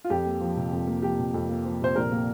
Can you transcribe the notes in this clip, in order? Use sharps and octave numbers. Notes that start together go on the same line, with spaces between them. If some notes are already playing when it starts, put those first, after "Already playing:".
F4
F2 G4
A#3
F3
C3
F2
A#3
F3 G4
C3
F2
A#3
F3
C3 C5
A#1 A#4
A#3